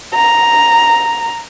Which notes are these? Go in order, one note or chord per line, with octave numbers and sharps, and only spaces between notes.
A#5